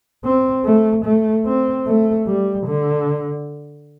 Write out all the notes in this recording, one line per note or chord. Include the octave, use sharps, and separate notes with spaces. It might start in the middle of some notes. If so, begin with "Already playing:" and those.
C4
A3
A3
C4
A3
G3
D3